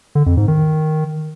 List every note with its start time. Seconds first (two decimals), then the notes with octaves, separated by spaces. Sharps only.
0.15 D3
0.26 F2
0.37 G#2
0.48 D#3